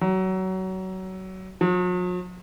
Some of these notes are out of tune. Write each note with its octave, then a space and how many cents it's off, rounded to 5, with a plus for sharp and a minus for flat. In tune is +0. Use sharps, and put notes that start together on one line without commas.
F#3 +25
F#3 -45